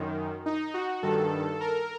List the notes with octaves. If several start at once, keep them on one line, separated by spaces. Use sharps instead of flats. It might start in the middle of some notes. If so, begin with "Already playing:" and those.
Already playing: F#2 D#3
D#4
F#4
G2 D#3 A4
A#4